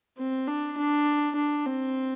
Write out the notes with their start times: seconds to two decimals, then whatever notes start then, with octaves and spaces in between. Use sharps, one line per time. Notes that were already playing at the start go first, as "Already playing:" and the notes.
0.18 C4
0.47 D4
0.77 D4
1.36 D4
1.66 C4